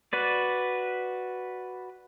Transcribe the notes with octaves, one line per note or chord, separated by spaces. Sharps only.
F#4 B4 D5